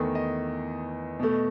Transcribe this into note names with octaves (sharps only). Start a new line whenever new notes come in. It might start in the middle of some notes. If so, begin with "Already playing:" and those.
Already playing: E2 D#3 A3 D#5
D#5
B2 A3